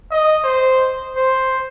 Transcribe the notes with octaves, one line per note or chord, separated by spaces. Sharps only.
D#5
C5
C5